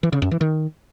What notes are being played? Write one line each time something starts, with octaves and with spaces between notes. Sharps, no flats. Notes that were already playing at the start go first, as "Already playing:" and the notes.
E3
C#3
F#2
E3
D#3